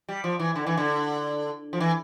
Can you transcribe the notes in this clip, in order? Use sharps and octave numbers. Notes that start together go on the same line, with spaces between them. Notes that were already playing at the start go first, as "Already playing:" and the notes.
G3
F3
E3
D3
E3
D3
F3
E3